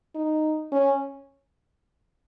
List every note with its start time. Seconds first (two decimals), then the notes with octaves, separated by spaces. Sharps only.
0.15 D#4
0.72 C#4